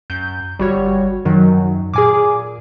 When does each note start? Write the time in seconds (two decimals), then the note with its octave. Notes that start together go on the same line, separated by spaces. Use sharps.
0.10 F#2 G6
0.59 G1 G3 F#4 C#5
1.25 F#2 D#3 F#3
1.94 A#2 G#4 G#5 D6